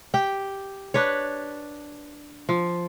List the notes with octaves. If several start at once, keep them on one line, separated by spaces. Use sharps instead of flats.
G4 G5
D4 B4 C#5
F3